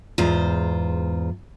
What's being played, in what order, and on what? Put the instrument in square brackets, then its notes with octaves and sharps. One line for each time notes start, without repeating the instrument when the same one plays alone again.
[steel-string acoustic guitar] E2 G#2 F4 C5